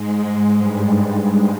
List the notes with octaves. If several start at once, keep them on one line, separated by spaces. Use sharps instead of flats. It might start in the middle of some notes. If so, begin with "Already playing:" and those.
Already playing: G#2 G#3
G2 G3